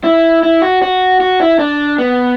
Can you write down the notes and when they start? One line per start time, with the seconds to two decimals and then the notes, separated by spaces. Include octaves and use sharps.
0.04 E4
0.43 E4
0.62 F#4
0.82 F#4
1.21 F#4
1.41 E4
1.59 D4
1.99 B3